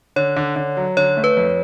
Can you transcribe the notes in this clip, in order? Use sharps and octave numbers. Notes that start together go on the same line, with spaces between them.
D3 C#5
D3
D3
F#3
D3 C#5
A3
B4
F2